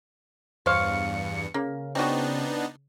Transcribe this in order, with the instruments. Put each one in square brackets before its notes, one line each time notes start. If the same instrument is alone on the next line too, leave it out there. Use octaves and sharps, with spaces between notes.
[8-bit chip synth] E2 G2 [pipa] C5 C#5 F5 [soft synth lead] C#7
[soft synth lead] C#3 [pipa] A#3
[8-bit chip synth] B3 D4 D#4 [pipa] C4 F#4